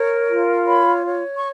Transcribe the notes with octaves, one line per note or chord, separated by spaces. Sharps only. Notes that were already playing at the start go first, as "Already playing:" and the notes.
Already playing: A#4 C#5
F4
C#5 B5
C#5
C#6